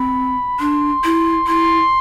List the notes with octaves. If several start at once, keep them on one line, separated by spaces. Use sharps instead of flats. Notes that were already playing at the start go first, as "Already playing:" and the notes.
Already playing: C4 B5
D4 C6
E4
E4 C6